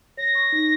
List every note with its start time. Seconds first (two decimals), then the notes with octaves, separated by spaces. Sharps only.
0.17 C#5 A#6
0.35 C#6
0.52 D#4